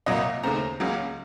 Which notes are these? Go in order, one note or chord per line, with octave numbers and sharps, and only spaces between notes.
C2 A#2 F#3 A#3 D#5
D#2 C#3 A3 C4 A#5
C#2 C#3 F#3 A#3